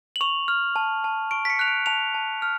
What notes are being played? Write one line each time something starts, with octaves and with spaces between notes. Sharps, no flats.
F#7
C#6 F7
F6
A5
A5
C#6 D7
B6
C#7
F#6 F7
D7
A5 F7
A5
F6